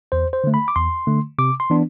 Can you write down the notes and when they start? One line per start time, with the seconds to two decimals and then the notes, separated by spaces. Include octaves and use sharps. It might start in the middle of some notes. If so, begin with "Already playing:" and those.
0.12 E2 C5
0.33 C5
0.44 D3 A3
0.54 B5
0.68 D6
0.76 E2 C6
1.07 D3 A3
1.38 C3 D6
1.60 C6
1.70 E3 B3 D4